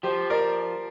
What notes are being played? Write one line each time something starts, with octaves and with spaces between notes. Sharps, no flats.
F3 G4 C5
A#4 D5